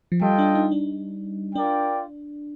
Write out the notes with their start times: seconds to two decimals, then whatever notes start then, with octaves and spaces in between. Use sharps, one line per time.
0.12 F3
0.21 G3 F4 A4 D#5 G5
0.39 D4
0.55 D#4
0.71 D4
1.55 D4 F4 A#4 D5 G5